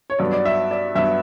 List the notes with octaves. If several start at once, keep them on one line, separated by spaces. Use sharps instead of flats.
C#5
G2 F#3 B3 D5
D5
E5
D5
G2 F#3 B3 E5